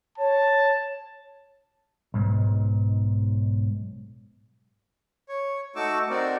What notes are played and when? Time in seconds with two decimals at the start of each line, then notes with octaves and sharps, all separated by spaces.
0.18 C#5 A5
2.14 B1 G#2
5.29 C#5
5.76 A3 D#4 F#4 C#6 D6 E6
6.10 C4 D#4 F#4 A#4 D5